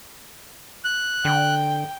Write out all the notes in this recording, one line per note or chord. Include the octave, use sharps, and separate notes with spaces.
F#6
D3 G5